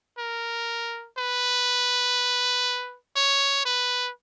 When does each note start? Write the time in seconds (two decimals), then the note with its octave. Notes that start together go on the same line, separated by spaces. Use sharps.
0.18 A#4
1.18 B4
3.16 C#5
3.65 B4